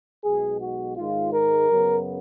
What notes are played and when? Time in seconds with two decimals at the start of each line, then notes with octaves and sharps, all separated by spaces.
0.24 B1 B2 G#3 G#4
0.61 F#4
0.97 G#2 D#3 G#3 F4
1.33 A#4
1.69 F#2 C#3 F#3 B3